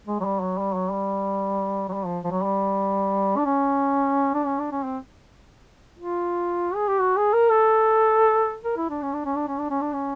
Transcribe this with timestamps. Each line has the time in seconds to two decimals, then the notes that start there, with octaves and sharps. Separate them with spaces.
0.07 G#3
0.20 F#3
0.24 G3
0.41 F#3
0.58 G3
0.75 F#3
0.92 G3
1.89 F#3
1.93 G3
2.06 F3
2.24 F3
2.31 F#3
2.44 G3
3.37 D4
3.45 C#4
4.34 D4
4.46 C#4
4.59 D4
4.72 C#4
4.85 C4
5.99 F4
6.75 G#4
6.88 G4
6.99 F#4
7.17 G#4
7.33 A#4
7.51 A4
8.64 A#4
8.77 E4
8.90 D4
9.03 C#4
9.13 D4
9.25 C#4
9.36 D4
9.48 C#4
9.59 D4
9.70 C#4
9.81 D4
9.93 C#4